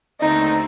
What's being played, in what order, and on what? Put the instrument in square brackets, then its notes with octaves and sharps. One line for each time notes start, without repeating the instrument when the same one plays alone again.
[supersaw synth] D#2 D3 A3 C4 [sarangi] D#4